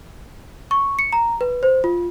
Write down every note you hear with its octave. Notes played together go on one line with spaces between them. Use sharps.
C#6
C#7
A#5
B4
C5
F4